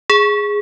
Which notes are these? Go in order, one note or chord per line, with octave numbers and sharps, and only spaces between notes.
G#4